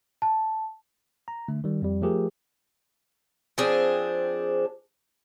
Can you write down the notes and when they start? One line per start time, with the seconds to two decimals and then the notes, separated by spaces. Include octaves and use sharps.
0.22 A5
1.28 A#5
1.48 D3 A3
1.64 D#3 G3
1.82 F2 G3
2.02 F3 A3 G4 G#4 A#4
3.58 F3 C4 D4 G#4